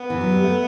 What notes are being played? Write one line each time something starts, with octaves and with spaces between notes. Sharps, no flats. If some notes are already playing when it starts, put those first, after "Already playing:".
Already playing: B3
E3
F#3
G3
A3